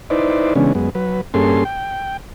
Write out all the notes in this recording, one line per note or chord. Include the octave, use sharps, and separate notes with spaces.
D#4 E4 B4 C5 D5
C#3 E3 G#3 B3 C#4 D4
F#2 G#3 B3
F#3 B4
G2 A#3 C#4 G#4 A4 C6
G5